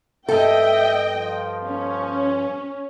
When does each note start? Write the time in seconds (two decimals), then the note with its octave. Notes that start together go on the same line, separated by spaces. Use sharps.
0.28 G2 A4 D#5 E5 G5
1.14 F3
1.66 C#4